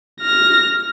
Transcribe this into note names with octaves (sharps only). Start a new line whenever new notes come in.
F6 A#6